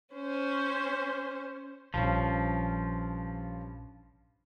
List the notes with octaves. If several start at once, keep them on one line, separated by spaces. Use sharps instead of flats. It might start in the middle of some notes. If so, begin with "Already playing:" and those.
C#4 C5
A#1 G2 F3 C#4